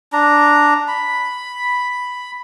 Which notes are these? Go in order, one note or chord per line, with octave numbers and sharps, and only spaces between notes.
D4 A#5
B5